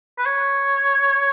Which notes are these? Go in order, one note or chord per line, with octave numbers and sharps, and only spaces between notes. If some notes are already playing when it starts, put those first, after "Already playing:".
B4
C#5